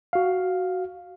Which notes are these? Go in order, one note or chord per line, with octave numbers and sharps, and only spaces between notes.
F#4 F5